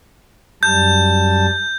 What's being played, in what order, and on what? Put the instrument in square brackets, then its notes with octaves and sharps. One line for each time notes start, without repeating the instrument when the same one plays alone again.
[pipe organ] F#2 G3 A5 [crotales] G6